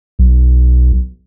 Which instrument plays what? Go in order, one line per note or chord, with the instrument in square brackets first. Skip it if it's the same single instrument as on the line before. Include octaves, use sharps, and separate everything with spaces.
[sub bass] B1